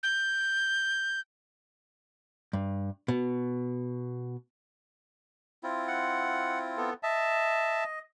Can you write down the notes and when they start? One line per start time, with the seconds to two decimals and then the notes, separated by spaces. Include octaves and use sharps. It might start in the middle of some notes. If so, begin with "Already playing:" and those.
0.03 G6
2.53 G2
3.08 B2
5.63 C4 E4 F4
5.88 F#5
6.77 B3 A4
7.03 D#5 E5 A5